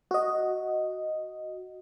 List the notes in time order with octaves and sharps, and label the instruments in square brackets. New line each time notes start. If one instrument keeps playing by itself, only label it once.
[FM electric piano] F#4 D#5